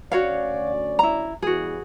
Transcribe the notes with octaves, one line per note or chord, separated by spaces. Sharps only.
D2 C#4 F#4 C#5 D5 F5
E4 A#5
E2 G2 E3 F#4 G#4